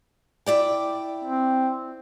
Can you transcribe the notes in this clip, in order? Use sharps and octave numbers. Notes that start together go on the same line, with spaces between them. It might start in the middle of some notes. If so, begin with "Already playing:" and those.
E4 D5 G5
C4